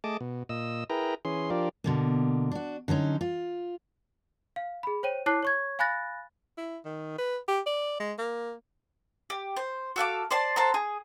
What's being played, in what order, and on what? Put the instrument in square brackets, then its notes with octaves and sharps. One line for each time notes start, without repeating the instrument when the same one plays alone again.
[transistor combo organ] A3 G#4 D#5 A5 D6
B2
A#2 D#5 E6
E4 G#4 A#4 B4 G5 A#5
E3 C#4 G#4 C6
F3 D4 F4 G4 A#4 D5
[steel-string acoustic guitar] B2 D3 A#3
D4 F#4
D3 F#3 C#4 D#4
F4
[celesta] F5
G#4 B5
C5 C#5 G5 D#7
E4 C#5 A5 D6 F#6 C7
C#5 C#6 G#6
F5 G#5 B5 F#6 A6 A#6
[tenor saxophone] E4
D#3
B4
G4
D5
G#3
A#3
[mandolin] G4
C5
F#4 A4 F5 D6
C5 D5 A5 C6
A4 C5 F#5 A#5
G#4